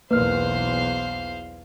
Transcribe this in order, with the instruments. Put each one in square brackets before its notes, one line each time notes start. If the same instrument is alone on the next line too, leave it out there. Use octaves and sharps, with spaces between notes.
[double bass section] B1 E2 [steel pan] A#3 [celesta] B4 F6 [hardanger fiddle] C5 F5